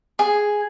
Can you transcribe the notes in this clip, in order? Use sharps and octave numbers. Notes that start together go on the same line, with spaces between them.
G#4